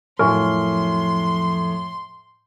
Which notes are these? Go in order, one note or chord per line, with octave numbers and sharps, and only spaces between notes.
F2 A2 F#3 A#4 G#5 C6 C#6 F6